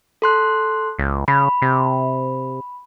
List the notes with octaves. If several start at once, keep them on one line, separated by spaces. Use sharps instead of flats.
A4 C6 F#6
C#2
C#3 B5
C3